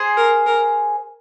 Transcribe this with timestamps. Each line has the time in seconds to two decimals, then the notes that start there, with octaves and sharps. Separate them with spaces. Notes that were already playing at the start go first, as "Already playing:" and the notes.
Already playing: G#4 C5
0.17 A#4
0.46 A#4